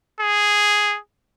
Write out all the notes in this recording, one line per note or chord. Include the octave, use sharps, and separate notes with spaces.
G#4